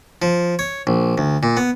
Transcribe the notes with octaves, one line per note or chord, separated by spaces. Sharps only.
F3
C#5
A#1
D2
A#2
B3